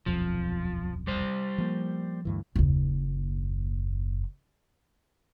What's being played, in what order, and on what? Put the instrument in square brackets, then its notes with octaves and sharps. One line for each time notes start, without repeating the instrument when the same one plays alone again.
[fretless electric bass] D#1 B1 F2 [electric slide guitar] F3
[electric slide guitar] G3 C5
[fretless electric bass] F3 A#3
D2 G2 E3
[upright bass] F#1 D#2